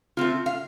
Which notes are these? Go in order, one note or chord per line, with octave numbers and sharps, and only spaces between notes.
A3 C4 F4
F5